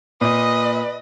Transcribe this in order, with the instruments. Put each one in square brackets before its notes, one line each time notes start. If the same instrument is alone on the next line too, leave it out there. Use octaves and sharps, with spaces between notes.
[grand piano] A#2 [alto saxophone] B4 [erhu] D#5 [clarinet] D#6